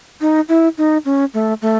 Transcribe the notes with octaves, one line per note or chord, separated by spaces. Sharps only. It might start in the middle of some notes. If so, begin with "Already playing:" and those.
D#4
E4
D#4
C#4
A3
A3